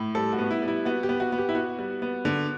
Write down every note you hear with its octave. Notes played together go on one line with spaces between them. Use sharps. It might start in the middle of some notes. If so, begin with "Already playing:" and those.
Already playing: A2
G3 A4
F#4
B3
E4
G3
E4
B3 F#4
G4
B3
F#4
B3
G4
E4
B3 F#4
G3
B3
D3